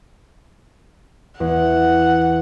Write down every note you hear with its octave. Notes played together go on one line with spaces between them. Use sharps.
E2 F#5